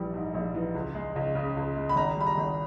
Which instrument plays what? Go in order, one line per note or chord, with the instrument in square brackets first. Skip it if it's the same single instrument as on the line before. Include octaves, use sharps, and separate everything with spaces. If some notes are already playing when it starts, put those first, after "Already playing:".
Already playing: [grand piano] A#1 E3 G3
G#2
A#1
E3
C#2
G#3
C#2
C#3
C#2
G#3
B5
G#1 A#5
G3 B5
A#5
G#1